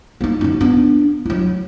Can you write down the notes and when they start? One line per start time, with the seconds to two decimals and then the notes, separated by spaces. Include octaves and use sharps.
0.21 A#3 D#4
0.41 F#2 D3
0.60 B3 D4
1.26 F#3 E4